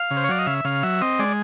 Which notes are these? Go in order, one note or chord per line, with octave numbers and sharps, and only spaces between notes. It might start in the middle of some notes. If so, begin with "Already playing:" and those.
Already playing: F5
C#3
C5
C#5
F#3 D5
D#5
C#3 E5
C#3 F5
F#3 E5
C4 D#5
G#3 D5